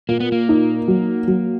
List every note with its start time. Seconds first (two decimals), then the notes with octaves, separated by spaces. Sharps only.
0.08 A#2 A#3
0.20 B3
0.32 A#3
0.49 D#4
0.88 F#3
1.28 F#3